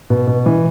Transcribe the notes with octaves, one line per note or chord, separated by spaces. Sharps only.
B2
B2
E3